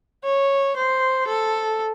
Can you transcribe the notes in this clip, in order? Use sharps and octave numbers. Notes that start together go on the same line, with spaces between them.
C#5
C5
A4